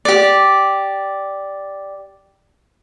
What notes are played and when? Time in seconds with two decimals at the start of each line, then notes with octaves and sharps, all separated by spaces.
0.05 G4 D5